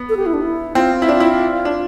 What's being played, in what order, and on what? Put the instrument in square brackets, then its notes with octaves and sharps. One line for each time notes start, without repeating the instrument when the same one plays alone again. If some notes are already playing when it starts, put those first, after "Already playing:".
Already playing: [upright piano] B3
[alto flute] A4
G4
E4
D4
E4
[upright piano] C4 [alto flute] F4
[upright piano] E4
D4
E4
D4